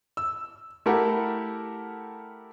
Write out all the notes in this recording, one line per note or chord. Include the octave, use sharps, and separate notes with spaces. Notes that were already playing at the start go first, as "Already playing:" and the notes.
E6
A3 E4 G4 A4 A#4 F#5